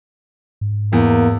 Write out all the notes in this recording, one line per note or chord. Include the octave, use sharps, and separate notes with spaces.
G#2
E2 A#3